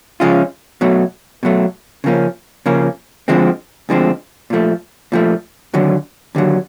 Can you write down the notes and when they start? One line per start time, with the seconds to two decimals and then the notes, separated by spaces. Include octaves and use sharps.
0.20 C#3 F3 G#3 C#4 F4
0.81 B2 F#3 A3
1.43 B2 F#3 A3
2.04 C#3 F3 A#3 C#4
2.66 C#3 F3 A#3 C#4
3.28 D2 D3 F3 G#3 C4
3.89 D2 D3 F3 G#3 C4
4.50 A#2 F3 A3
5.12 A#2 F3 A3
5.74 D#2 D3 F#3
6.35 D#2 D3 F#3